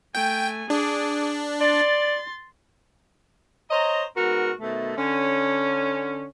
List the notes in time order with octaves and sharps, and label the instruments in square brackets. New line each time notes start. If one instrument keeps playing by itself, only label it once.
[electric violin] A3 G#5 [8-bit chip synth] G5
[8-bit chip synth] D4 [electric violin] G#4 D6
[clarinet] D5 [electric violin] C6 A6
[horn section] C5 C#5 D#5 A#5
G#2 B3 F#4 A#4
B2 D#3 A3
D3 C#4